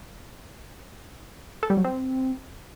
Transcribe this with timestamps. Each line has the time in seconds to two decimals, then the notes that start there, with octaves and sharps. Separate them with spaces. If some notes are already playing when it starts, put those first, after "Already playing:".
1.63 A4
1.70 G3
1.77 F#3
1.84 C4